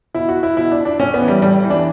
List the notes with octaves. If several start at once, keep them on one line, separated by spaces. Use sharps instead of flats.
B2 E4
F#4
E4
B2 E4
D4
D4
A2 C#4
B3
E3
G3
A2 G3
E3
D4